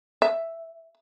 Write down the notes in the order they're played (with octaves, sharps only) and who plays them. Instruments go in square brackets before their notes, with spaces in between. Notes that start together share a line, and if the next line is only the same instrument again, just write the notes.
[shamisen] E5